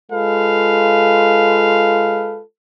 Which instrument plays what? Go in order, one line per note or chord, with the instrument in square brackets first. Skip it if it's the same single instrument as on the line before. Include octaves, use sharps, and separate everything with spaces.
[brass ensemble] G#3 F4 A4 B4 F5